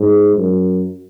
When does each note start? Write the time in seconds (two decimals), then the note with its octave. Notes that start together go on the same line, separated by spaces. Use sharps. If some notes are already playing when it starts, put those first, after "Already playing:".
Already playing: G#2
0.37 F#2